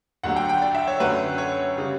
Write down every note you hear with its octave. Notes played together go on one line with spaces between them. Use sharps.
D2 D3 F#3 A3 F#5
G5
G5
D5
E5
C#5
F#2 D3 F#3 A3 B4
C#5
C#3 G3